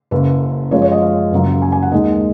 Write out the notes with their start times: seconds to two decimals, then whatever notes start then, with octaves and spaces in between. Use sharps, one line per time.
0.11 F#1 F#2 C#3 B4
0.71 F#2 F3 G#3 C#5
0.82 C#5
0.92 D#5
1.02 F5
1.32 F#1 F#2 C#3 F#3
1.62 G#5
1.72 G#5
1.83 F#5
1.92 D#2 D#3 G#3 D#5